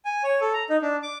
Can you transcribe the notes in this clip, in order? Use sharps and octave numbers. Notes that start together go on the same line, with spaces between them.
G#5
C#5
A4
A#5
D#4
D4
D6